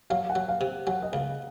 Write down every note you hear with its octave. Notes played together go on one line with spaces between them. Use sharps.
F#3 F5
F#5
F#3
F5
C3
F#3 F#5
D#5
C#2 F5